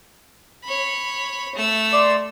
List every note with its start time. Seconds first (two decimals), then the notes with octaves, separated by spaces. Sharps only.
0.64 C#5 B5
1.55 A3 E6
1.93 D5 C6 D6